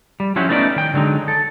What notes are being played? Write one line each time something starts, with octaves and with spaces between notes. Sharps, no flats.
G3
F3 F#3 C#4 E4 F#4 G4
A3 B3 C#4 D#4 B4 D5
D#3 G5
D3 F#3 G#3 D#4
A4